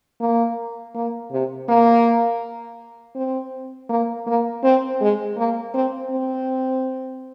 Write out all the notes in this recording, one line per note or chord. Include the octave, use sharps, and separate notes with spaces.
A#3
A#3
C3
A#3
C4
A#3
A#3
C4
G#3
A#3
C4
C4